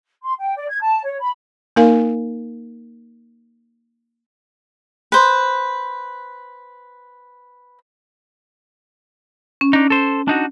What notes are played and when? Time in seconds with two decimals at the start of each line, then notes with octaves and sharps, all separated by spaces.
0.23 C6
0.38 G5
0.56 D5
0.69 G#6
0.80 A5
1.04 C#5
1.20 B5
1.76 A#3 D#4 A#4 F5 G#5
5.12 B4 C5
9.61 C#4
9.73 D4 D#4
9.90 A4 C5
10.28 D4 D#4 F#4